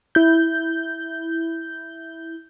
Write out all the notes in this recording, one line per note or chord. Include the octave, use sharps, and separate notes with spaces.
E4 G6